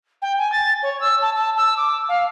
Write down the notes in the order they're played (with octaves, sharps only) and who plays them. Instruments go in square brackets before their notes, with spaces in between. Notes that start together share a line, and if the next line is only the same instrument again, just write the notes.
[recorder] G5
G#5
A6
C#5
E6
A5
A5
E6
D6
F5